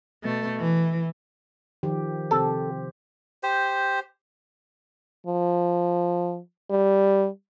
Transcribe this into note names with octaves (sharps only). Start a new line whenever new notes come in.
B2 A3
E3
D#3 F3 G4
C3 C4 G4 A4
G4 C5
F3
G3